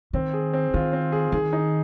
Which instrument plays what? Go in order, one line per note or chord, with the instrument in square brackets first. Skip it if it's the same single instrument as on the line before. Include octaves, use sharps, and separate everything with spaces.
[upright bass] D#3 [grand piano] C4
[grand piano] G#4
C4
[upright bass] D#3 [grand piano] F4
[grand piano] C4
G#4
[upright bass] D#3 [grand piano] G#4
[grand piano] D#4